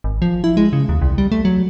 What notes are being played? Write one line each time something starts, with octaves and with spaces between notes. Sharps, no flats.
G#1
F3
E4
G#3
C#3
D#2
C2
G3
A3
F#3